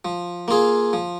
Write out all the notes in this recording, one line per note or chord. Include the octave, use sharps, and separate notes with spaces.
F3
A#3 F4 G#4
F3